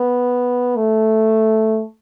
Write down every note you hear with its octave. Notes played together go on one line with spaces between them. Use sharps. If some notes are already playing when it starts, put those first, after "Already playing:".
Already playing: B3
A3